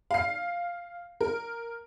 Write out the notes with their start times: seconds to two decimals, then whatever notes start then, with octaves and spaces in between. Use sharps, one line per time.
0.11 F5 C7
1.21 A#4